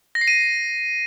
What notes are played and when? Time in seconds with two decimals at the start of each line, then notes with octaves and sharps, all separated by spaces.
0.15 A#6
0.21 C7
0.28 D#7